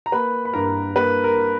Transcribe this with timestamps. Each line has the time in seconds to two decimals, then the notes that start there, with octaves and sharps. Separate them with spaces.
0.06 A#5
0.12 A#3 B4 B5
0.45 B5
0.53 G2 A#4 A#5
0.96 A#3 B4
1.24 A#4